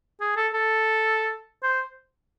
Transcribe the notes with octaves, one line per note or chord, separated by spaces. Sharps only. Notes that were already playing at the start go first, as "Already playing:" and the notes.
G#4
A4
A4
C5